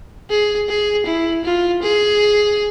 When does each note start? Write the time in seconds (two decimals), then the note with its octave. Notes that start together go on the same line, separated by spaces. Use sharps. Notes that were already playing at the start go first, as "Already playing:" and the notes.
0.30 G#4
0.69 G#4
1.06 E4
1.44 F4
1.83 G#4